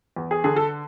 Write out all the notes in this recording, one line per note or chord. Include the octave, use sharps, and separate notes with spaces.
E2
G#4
D3 G#4
A4